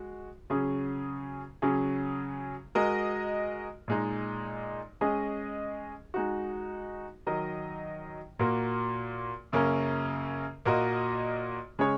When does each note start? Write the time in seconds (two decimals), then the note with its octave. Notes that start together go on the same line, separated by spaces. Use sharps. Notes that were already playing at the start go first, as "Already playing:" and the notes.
Already playing: G#3 F#4
0.50 C#3 F#3 C#4 G#4
1.62 C#3 F#3 C#4 G#4
2.75 G#3 F#4 A#4 D#5
3.88 A#2 G#3 D#4
5.01 G#3 C#4 G#4 D#5
6.14 G#3 D#4 F#4
7.26 D#3 F#3 D#4 A#4 D#5
8.39 A#2 A#3 F#4 A#4
9.52 F#2 C#3 A#3 C#4 A#4
10.65 A#2 A#3 F#4 A#4 D#5
11.79 C#3 G#3 C#4 G#4 C#5